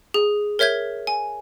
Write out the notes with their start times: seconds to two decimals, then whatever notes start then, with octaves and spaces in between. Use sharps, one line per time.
0.14 G#4
0.59 A#4 C#5 E5 G6 G#6
1.07 G#5